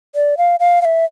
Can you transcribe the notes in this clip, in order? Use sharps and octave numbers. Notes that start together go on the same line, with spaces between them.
D5
F5
F5
F5
E5